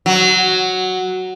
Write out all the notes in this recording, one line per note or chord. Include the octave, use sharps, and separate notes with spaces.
F#3